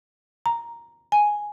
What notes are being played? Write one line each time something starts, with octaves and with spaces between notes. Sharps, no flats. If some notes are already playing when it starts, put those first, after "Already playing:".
A#5
G#5